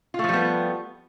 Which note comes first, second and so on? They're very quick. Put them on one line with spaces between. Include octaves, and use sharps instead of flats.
F4 A3 F3 G3 B3